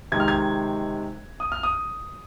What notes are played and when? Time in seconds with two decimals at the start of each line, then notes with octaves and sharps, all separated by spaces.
0.12 C3 D#3 G#3 G#6
0.20 F6
0.28 G#6
1.40 D#6
1.52 F6
1.63 D#6